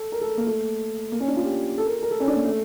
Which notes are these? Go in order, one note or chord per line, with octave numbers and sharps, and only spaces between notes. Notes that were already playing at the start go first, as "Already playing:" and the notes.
Already playing: A4
A#4
A4
A#3
A3
A#3
C#4
D4
F4
G4
A4
A#4
A#4
A4
C#4
D4
A#3
A3